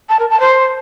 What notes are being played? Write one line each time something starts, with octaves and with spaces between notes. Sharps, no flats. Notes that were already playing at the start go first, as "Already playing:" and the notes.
A5
A#4
A5
C5